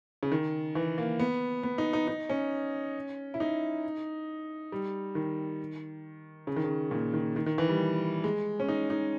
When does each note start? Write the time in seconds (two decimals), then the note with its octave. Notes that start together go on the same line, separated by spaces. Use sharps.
0.23 C#3
0.32 D#3
0.75 E3
0.98 A#3
1.19 B3
1.63 B3
1.78 D#4
1.93 D#4
2.08 D#4
2.29 C#4
3.34 E4
3.40 D#4
4.72 G3
5.15 D#3
6.47 C#3
6.56 D#3
6.64 C#3
6.91 A#2
7.14 D#3
7.36 D#3
7.46 D#3
7.58 E3
7.69 G3
8.24 G#3
8.60 C#4
8.68 D#4
8.90 D#4